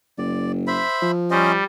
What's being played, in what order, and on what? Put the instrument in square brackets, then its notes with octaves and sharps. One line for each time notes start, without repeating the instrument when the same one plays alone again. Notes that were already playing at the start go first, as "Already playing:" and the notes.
[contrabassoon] F#1 [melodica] D5
[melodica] C5 E5 B5
[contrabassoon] F3
[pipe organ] G3 [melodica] C#4 C5 D#5